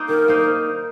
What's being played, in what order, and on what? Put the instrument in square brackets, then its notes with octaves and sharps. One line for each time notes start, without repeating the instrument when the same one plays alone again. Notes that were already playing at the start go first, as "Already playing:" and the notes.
Already playing: [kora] A#3 D#4 C5
[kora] D#3 [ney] A#4
[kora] A#3 D#4 C5